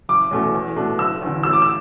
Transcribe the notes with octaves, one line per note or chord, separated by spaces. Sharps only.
F#1 D6
E2 B2 A3 C#4
E2
B2 A3 D4
F#1 E6
E2 D3
A1 E6
D6
E6